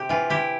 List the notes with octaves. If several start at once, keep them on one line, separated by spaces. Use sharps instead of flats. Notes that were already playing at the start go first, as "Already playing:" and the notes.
Already playing: C3 C4 G4
E3 F4
E4 G4